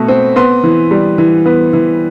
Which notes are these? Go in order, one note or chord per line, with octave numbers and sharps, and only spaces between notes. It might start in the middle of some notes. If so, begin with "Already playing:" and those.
Already playing: B2 A3
C4
B3 C6
E3
G3
E3
B3
E3